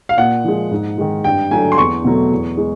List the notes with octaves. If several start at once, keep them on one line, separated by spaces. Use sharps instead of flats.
F5
A#2 F#5
F3 G#3
G#2
D#3 G#3
G2 G5
D3 F#3 A3 G#5
C6
E2 C#6
B2 F#3 A3
E2
G#3